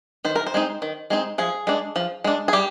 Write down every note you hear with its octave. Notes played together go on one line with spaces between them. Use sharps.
D#3 C5
A#4
C5
G#3 C4 D#4
D#3
G#3 C4 D#4
F3 G#4
G#3 D4
F3
G#3 D4
G#4
G3 G4